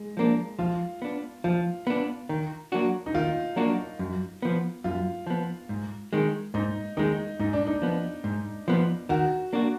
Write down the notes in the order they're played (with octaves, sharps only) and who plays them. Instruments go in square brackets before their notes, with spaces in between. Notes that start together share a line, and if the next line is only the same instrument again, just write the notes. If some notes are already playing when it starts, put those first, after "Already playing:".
Already playing: [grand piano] G#3
[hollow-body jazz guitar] F3 A#3 D4
[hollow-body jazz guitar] F3 [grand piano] F4
[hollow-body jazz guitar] B3 D4
[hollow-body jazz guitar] F3 [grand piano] F4
[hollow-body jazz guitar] B3 D4
D#3
F#3 A#3 D4 F#4
[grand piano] D#4
[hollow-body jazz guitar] D#3 [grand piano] F4
[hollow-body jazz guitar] F#3 A#3 D4 F#4
F#2
F3 B3
[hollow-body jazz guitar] F#2 [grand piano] F4
[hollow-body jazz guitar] F3 B3
G#2
D#3 G#3
[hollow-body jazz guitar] G#2 [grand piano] D#4
[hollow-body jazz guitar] D#3 G#3 [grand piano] D#4
[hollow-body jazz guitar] G#2 [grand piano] D#4
[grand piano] D4
D#4
[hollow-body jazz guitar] F3 B3
G#2
F3 B3
[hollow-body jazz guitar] D#3 [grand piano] F#4
[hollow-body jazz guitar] A#3 D4 F#4